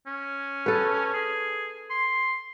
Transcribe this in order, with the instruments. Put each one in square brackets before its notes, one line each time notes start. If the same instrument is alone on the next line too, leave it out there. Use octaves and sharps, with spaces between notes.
[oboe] C#4
[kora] A4 B4
[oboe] G#4
C6